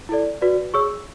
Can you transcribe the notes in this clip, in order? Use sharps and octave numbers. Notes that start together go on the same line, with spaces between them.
E4 A4 D5
F#4 B4 D5
G#4 C#5 C#6 E6